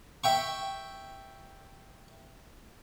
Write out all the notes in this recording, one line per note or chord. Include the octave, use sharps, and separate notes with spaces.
E5 G5 C#6